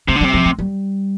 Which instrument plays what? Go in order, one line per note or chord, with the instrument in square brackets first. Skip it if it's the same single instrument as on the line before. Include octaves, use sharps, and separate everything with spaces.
[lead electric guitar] C3 [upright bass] A3
[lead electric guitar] D3
[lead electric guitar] C3 [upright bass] G3
[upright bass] F3
A3
G3